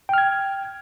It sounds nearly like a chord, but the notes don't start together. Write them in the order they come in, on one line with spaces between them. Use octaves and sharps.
G5 F6 G#6